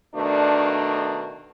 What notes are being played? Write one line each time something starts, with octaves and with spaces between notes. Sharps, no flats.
B2 D#3 A3 D4